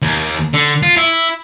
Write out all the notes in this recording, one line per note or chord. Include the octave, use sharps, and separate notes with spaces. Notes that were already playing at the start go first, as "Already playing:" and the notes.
D#2
D3
F4
E4